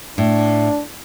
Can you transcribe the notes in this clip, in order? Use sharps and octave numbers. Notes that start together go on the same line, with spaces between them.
A2 D4